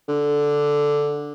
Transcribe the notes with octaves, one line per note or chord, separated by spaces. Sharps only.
D3